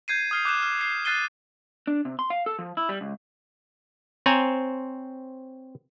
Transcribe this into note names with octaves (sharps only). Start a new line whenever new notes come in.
G6 G#6 C7 D#7
D#6 F6 C7
D6 F#6 G6 E7
F6
C7
F6 F#6 A6 C7 D#7 G7
D4
C3
C6
F5
A4
F3
E4
G3
C#2
C4 C5 C#5 G5 G#5 A#5